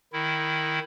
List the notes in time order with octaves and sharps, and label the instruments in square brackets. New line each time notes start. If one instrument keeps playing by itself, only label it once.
[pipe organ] D#3 E4